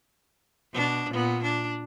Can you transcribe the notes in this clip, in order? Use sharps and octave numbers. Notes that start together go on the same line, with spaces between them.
B2 D4
A#2 B3
D4